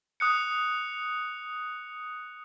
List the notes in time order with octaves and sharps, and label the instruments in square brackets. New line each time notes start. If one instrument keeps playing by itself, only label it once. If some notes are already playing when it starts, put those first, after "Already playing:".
[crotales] D#6 F#6 C#7